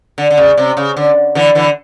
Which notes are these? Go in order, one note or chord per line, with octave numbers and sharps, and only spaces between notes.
D3
D3
C#3
C3
C#3
D3
D3 E3
D3 E3